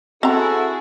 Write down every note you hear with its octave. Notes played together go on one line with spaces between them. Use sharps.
C4 E4 F#4 G#4 A4 A#5